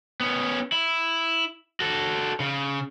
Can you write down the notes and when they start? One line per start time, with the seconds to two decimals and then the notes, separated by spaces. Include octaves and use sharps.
0.20 B3 C#4
0.72 E4
1.80 F#4 A4
2.40 C#3